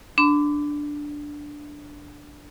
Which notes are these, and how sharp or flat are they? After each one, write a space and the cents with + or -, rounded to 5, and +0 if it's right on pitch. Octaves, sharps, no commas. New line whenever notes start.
D4 +0 B5 +45